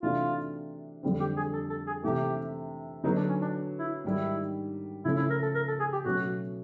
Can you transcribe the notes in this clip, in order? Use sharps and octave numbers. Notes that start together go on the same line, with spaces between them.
C3 E3 A3 D4 F4 F#4
F2 D3 G3 C4
G4
G#4
A4
A4
G#4
C3 E3 A3 G4
D3 F#3 B3 D#4
D4
C#4
D4
E4
G#2 D#3 G3 E4
C#3 F3 A3 C#4 E4
E4
A#4
A4
A#4
A4
G#4
G4
B2 F#3 A3 C#4 F#4